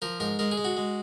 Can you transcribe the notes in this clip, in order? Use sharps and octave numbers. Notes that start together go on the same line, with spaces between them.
F3 A#4
G#2 A#4
G#3 A#4
G#4
G#3
F#4
G#3